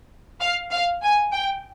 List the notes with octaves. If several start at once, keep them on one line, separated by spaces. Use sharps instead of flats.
F5
F5
G#5
G5